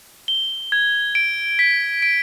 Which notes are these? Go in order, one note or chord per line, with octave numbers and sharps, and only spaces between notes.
G7
G#6
D7
B6
D7